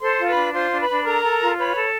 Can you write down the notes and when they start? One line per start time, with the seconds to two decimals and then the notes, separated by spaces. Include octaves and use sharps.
0.01 A4 C5 C6
0.19 F4
0.28 B4 B5
0.36 D4
0.54 F4 C5 C6
0.72 D4
0.80 B4 B5
0.89 D4
1.06 A4 A#4 A#5
1.24 A4
1.41 F4
1.58 B4 C#5 B5
1.76 A4